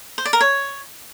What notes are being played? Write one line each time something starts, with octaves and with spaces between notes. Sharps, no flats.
C5
D5
A#4
C#5